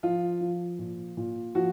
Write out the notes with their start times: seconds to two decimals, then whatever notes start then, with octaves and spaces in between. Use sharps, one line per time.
0.03 F3 F4
0.41 F3
0.79 A#2
1.17 A#2
1.55 F3 F#4